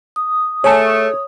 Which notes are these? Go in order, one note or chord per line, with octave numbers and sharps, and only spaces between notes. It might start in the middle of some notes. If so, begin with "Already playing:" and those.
D#6
A3 G#4 A4 C#5